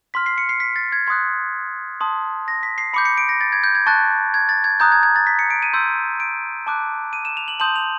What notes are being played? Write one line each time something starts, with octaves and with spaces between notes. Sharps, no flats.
C6 F6 B6
C7
C#7
C7
B6
A6
G#6
C6 D#6 F#6 G#6
A5 C6 D#6
A#6
B6
C7
B5 D6 G6 C#7
C#7
D7
A#6
A6
G#6
G6
G#6
A5 C#6 F#6 A6
G#6
A6
G#6
A#5 D#6 F#6 G6
G#6
G#6
A6
B6
C#7
D7
D#7
C6 E6 G6
D7
A5 D6 F#6
D#7
E7
F7
F#7
A5 C6 D#6 G6 F#7
F7